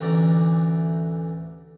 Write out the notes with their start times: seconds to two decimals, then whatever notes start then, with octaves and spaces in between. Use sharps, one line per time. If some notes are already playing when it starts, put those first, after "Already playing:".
0.01 A1 D2 E3 D5 A#5